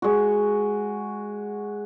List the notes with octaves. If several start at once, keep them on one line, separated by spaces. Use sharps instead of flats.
G#3 F#4